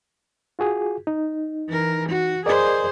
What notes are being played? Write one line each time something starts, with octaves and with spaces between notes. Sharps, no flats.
F4 F#4 G#4
D#4
E3 A#4
F#4
G#4 A#4 C5 D5 D#5